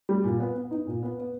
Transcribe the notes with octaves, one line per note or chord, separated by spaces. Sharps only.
G3
A#2
B3
B3
D#4
A#2
B3
B3